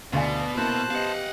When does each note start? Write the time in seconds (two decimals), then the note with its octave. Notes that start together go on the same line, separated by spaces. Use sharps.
0.13 D2 B2 D5 F5 G#5
0.57 A#3 E4 C5 A5 F#6
0.91 B3 G4 D#5 F5 F#5